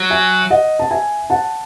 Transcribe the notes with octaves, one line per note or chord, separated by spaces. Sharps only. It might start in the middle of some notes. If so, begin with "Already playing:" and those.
Already playing: F#3
E5 G#5
D#5 F#5
A5
E5 G#5
F#5 A5